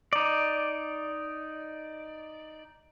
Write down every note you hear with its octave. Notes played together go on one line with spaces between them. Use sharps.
D#4 D5